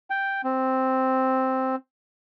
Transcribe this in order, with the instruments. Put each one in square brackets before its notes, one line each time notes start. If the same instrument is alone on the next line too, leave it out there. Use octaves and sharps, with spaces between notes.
[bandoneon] G5
C4